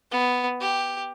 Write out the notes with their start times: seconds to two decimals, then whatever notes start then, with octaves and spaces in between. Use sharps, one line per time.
0.11 B3
0.60 G4